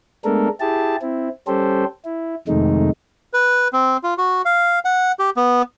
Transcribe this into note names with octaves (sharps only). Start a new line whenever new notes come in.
G#3 A3 B3 D4 A4 A#4
E4 G4 G#4 A5
C4 E4
G3 C#4 G4 A4 C5
E4
F2 C3 D#3 G#3 A3 D#4
B4
C4
F4
F#4
F5
F#5
G4
B3